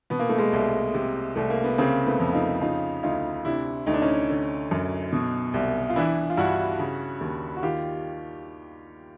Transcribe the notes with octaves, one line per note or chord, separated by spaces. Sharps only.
B2 B3
A#3
A3
G#3 A#3
C2
C3
C2 A3
A#3
B3
C#3 A#3 C4
A3 B3
F2
D#4 F4
C#3 D#4 F4
D2 D#4 F4
C3 D4 E4
D2 D#4
D4
C#4 D#4
D3
F#2
B2
C2
F4
E3 D4 E4
F4
G2 E4 F#4
C#3
D#2
F#4
D#3 F4 G4